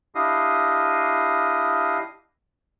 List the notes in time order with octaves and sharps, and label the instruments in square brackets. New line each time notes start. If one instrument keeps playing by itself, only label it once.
[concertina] D4 E4 G4 D#5 F5 D#6